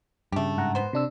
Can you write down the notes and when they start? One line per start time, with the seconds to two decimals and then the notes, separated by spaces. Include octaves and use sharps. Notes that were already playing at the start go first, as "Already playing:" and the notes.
0.32 G2 C#3 A3 G4
0.58 G#2 F#5 A#5
0.75 B3 C5
0.93 C3 D4 E6